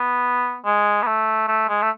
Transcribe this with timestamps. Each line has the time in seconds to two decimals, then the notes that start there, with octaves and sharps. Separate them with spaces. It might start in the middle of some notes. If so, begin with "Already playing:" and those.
Already playing: B3
0.65 G#3
1.03 B3
1.07 A3
1.48 A3
1.69 G#3
1.82 A3